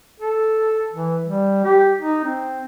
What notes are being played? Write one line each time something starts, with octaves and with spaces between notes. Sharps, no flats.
A4
E3
G3
G4
D#4
C4